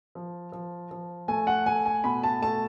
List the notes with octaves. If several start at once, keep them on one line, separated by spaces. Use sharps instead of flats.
F3
F3
F3
A3 G#5
F#5
A3 G#5
G#5
B2 B5
A5
A3 A5